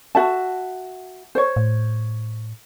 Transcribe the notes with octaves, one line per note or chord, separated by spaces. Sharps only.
F#4 E5 A5
C5 C#5
A2